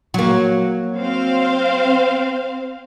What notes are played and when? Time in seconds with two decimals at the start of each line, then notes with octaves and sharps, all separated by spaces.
0.14 F#3 A#3
0.95 C4 C5 F5